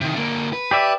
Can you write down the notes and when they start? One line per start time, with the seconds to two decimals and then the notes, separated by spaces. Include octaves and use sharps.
0.01 C3 D#3
0.15 D3 A#3
0.53 B4
0.71 G4 D5 E5